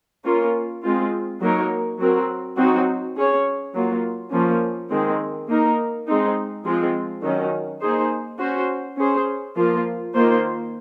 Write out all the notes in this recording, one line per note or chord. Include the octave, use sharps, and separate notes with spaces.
A#3 C#4 F4 A#4
G#3 C4 F4
F#3 A#3 D#4 A#4 C#5
F#3 C4 F#4 A#4
F#3 C4 D#4 F#4
C#4 G#4 C#5
F#3 A#3 F4
F3 A#3 C#4
D#3 G#3 C4
A#3 D#4 A#4
G#3 C4 D#4
F3 G#3 C4 F4
D#3 F#3 C#4
A#3 D#4 G#4 C5
C#4 F#4 C5
C#4 G#4 C5
F3 A#3 F4
D#3 A#3 F4 C5